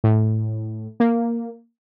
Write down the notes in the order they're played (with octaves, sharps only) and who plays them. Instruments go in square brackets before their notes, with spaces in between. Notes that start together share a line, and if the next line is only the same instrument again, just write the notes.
[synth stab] A2
A#3